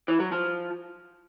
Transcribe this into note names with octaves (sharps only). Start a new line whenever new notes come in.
E3
F#3
F3